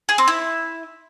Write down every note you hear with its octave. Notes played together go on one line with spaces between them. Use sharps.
G#4
C4
E4